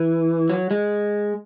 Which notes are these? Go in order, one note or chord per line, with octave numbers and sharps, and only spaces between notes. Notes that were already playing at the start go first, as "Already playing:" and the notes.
Already playing: E3
F#3
G#3